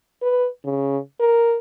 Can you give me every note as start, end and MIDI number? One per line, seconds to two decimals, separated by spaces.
0.22 0.48 71
0.65 0.98 49
1.20 1.59 70